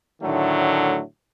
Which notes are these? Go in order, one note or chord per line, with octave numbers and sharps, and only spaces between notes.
A2 D3 D#3 F#3 A3